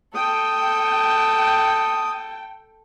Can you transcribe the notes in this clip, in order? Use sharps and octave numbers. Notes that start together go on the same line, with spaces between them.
A4 G5 D#6